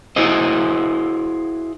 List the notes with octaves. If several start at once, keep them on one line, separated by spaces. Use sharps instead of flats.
E4 F#4 G#4 C5 D#5